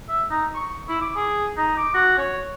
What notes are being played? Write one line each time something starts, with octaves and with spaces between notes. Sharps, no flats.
E5
D#4
C#6
E4
D6
G#4
D#4
D6
F#4
C#5